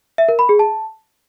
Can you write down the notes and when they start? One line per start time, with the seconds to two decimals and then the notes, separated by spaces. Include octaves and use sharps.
0.18 E5
0.29 A#4
0.39 B5
0.49 G#4
0.59 A5